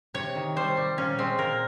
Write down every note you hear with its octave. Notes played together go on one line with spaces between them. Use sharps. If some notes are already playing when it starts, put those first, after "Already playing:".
C3 C#5
D#3
G3 C5
G3
A#2 C#4
G#3 C4
A#2 A#4